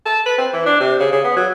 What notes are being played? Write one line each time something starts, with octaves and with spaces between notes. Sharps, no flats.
A4
B4
C4
E3
D4
C3
C#3
C#3
B3
F#3